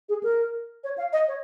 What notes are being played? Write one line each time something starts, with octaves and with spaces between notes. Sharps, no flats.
G#4
A#4
C#5
F5
D#5
C#5